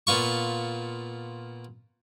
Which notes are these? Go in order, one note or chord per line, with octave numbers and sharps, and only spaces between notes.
A#2 B3 F4 C#6